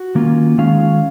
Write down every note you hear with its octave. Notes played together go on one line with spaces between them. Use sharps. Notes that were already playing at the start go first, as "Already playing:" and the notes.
Already playing: F#4
D#3 A#3 C#4 F4
D#3 G#3 C#4 F4 F5